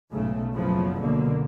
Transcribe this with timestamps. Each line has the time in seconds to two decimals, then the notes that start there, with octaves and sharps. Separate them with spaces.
0.11 B1 G#2 C#3 A3
0.54 F#1 C#3 F3 F#3 B3
1.00 C#2 B2 D3 A#3